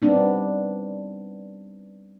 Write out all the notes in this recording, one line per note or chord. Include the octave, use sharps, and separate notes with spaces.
G3 B3 C4 D4 D#4